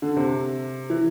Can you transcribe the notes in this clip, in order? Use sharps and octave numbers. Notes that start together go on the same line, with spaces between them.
D3
C3
E3